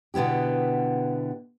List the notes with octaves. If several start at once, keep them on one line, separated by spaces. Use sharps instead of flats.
B2 D3 B3 E4 G4